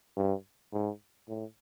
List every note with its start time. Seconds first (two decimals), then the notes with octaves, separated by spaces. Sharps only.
0.17 G2
0.73 G#2
1.28 A2